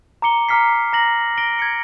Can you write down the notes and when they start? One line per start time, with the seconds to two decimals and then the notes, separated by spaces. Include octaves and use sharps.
0.22 A#5 D6 C#7 G7
0.49 A#5 D6 F6 B6 C7
0.93 A#5 A#6 F#7
1.38 A#6 D7 G7
1.59 G#6 C#7